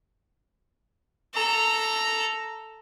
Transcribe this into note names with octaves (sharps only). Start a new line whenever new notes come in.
A4 A#5